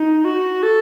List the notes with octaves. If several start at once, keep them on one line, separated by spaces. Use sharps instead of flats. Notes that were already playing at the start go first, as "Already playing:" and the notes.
Already playing: D#4
F#4
A4